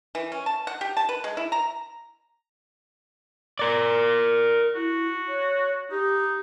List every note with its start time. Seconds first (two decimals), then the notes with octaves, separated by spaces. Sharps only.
0.15 E3
0.32 C#4
0.46 A5
0.67 F#5
0.81 G4
0.97 A5
1.09 B4
1.24 G#3
1.37 E4
1.52 A#5
3.59 A#4 D5
4.75 E4 F#4
5.28 C#5
5.91 D#4 G4